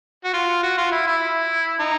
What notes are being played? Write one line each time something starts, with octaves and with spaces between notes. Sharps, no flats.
F#4
F4
F#4
F4
E4
E4
D#4